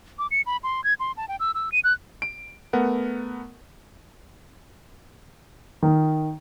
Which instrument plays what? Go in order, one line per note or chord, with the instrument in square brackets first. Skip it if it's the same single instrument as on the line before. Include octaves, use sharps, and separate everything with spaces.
[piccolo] D6
C#7
B5
C6
G#6
C6
A5
G5
E6
E6
D#7
F#6
[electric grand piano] D7
A3 B3 A#4 F#5
[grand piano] D#3